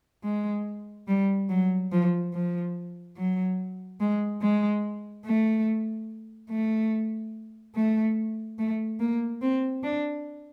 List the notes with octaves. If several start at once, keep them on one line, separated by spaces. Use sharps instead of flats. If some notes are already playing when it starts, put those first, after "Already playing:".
G#3
G3
F#3
F3
F3
F#3
G#3
G#3
A3
A3
A3
A3
A#3
C4
D4